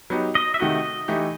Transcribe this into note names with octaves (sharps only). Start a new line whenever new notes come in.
F#3 B3 D#4 G4
D#5
E5
C3 D#3 A3 D#4 F#4 D#5
E3 A3 D#4 G4